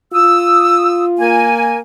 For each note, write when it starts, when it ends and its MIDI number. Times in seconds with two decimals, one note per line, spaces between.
0.13 1.49 65
0.13 1.04 87
0.13 1.04 88
1.19 1.78 58
1.19 1.78 70
1.19 1.78 80